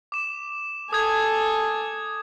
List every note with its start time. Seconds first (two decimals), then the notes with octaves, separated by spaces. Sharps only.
0.12 D6 E7
0.93 A4 G#5 D#6 G6 G#6